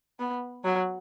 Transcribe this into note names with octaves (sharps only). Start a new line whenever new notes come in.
B3
F#3